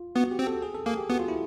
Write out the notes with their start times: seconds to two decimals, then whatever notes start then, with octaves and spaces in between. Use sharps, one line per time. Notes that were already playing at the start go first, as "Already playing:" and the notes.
Already playing: F4
0.15 B3 F#4
0.31 G4
0.39 C4
0.47 A4
0.62 G#4
0.74 A4
0.86 A#3 G#4
0.98 G4
1.10 B3 F#4
1.19 F4
1.28 E4